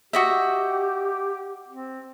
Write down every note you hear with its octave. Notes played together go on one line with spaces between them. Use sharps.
F#4 G4 D#5 E5
C4